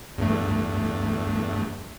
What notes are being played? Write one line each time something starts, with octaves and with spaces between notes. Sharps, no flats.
E2 G2 A3